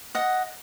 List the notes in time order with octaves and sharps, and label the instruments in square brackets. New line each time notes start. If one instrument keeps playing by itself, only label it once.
[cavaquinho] D#5 F#5